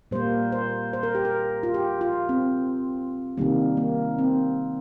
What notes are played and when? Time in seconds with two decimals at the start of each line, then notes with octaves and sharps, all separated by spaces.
0.11 A#2 G3 A#3 C5
0.52 C5
0.93 C5
1.03 A#4
1.15 G4
1.25 A#4
1.63 F4
1.74 G4
2.01 F4
2.29 C4
3.37 C3 D#3 G3 A#3
3.77 A#3
4.19 C4